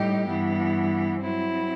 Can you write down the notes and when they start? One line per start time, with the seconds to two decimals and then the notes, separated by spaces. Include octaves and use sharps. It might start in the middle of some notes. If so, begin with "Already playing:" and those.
Already playing: A2 G3 D#4 G4
0.27 G2 E3 B3
1.22 F#3 C4 E4